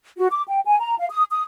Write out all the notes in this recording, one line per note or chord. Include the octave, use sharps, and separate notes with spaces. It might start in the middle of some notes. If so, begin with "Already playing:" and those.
F#4
D6
G5
G#5
A#5
F5
D#6
D#6